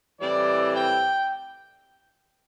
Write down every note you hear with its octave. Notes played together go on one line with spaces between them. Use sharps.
A2 E3 G3 C4 D5
G5